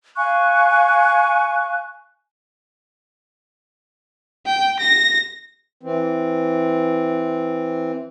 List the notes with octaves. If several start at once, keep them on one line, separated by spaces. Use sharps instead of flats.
F5 G#5 C#6 F#6
G5
A#6
E3 C4